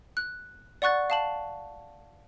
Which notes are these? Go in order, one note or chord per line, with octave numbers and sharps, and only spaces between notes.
F#6
D5 F#5 C#6 F#6 A6
F5 A5 F#7